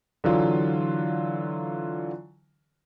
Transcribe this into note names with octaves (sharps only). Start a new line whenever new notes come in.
D3 E3 F#3 F4